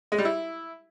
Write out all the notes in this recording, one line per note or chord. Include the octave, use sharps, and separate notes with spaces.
G#3
G3
E4